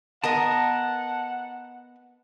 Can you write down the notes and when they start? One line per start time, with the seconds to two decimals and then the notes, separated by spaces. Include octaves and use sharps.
0.24 B3 A#4 D#5 F#5 A5 A#5